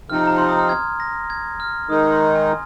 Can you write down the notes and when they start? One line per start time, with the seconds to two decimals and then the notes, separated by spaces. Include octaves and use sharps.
0.09 C3 F3 C4 D#4 F6
0.27 A#5
0.38 C6
0.49 D#6
0.59 F6
0.69 G#6
1.00 A#6
1.30 G#6
1.60 F6
1.89 D#3 G#3 D#4 D#6
2.12 C6
2.35 G#5